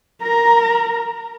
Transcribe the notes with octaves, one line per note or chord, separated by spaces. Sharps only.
A#4 A#5